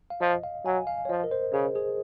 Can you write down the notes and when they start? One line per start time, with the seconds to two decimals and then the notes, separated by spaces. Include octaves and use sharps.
0.10 F5
0.21 F3 D#5
0.43 F5
0.65 F#3 G#5
0.87 F5
1.05 C#5
1.09 F3 D#5
1.24 A#4
1.31 C5
1.53 C#3 G#4
1.75 G#4